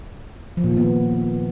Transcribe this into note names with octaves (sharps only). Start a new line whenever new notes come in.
F3
A#2
D#3
B3